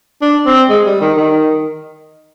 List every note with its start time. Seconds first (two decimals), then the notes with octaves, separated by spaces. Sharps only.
0.22 D4
0.46 C4
0.70 G#3
0.86 G3
1.01 D#3
1.17 D#3